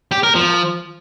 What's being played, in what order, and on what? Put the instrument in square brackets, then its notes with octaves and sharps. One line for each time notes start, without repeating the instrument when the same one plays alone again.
[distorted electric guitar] G4
A#4
F3